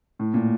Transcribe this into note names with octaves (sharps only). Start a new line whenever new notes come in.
A2
A#2